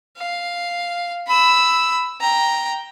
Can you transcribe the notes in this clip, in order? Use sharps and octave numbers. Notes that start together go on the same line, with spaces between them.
F5
B5 E6
G5 A#5